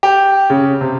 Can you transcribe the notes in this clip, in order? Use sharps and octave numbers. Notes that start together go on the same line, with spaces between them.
G4
C#3
C3